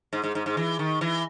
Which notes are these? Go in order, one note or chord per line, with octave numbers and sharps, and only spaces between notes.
G#2
G#2
G#2
G#2
E3
D#3
E3